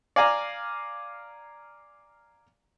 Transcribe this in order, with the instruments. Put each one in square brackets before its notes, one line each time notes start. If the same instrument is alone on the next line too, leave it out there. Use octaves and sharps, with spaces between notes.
[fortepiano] D5 F5 G#5 A#5 D6